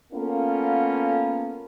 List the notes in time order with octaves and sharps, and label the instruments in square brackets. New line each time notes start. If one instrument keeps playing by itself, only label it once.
[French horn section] A#3 B3 C#4 F4 A4 A#4